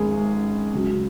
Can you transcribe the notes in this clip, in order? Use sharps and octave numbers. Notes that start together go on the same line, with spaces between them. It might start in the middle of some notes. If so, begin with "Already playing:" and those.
Already playing: G#1 G#4
C#2 C#3 F#3